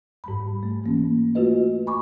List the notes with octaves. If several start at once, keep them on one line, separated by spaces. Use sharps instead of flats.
G#2 G3 B5
A3
E3 A#3 C#4
A3 F4 F#4 B4 D#5
G#5 B5 C#6 D6